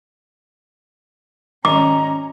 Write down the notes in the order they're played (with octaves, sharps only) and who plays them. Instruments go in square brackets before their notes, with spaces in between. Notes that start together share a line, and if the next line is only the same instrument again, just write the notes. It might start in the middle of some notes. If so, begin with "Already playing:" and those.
[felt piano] G#1 D#5 [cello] C#4 [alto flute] A#5 [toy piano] D6